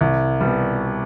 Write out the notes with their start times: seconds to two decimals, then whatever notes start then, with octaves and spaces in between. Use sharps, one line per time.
0.01 C2
0.41 B2 G3